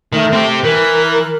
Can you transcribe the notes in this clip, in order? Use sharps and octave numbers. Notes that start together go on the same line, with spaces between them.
D#3 A3
C4 G4
E3 A#4